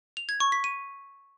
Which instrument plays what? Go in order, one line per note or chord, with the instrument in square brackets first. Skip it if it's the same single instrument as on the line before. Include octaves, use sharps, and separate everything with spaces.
[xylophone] F7
G#6
C#6
B6
D#7